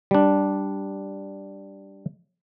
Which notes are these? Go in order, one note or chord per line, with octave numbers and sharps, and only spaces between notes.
G3 D4